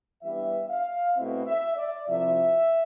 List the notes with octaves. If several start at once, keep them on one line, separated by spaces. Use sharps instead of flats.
G2 E3 G3 B3 D4 E5
F5
B2 A3 C4 E4 E5
E5
D5
C2 C3 F3 E5